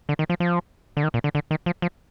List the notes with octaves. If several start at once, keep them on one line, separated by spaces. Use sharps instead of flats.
D3
D#3
F3
F3
D3
D#3
A#2
D3
D3
D#3
F3
F3